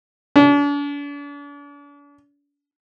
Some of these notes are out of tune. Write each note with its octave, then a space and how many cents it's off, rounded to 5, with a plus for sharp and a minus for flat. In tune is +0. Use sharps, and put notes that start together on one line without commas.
D4 -40